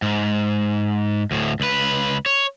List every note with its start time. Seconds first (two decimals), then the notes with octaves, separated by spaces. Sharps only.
0.02 G#2
1.31 D2 A2
1.60 C#2 B4
2.26 C#5